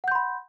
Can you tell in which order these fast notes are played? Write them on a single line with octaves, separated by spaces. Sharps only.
F#5 G6 C6 B5